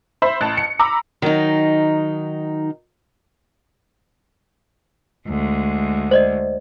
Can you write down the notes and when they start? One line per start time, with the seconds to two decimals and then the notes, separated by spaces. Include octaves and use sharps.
0.22 C5 E5 B5
0.41 A1 A5
0.57 C#7
0.79 A#5 B5 D6 E6
1.22 D#3 F#3 D#4
5.28 D2 G#3
6.11 C5 D5 D#5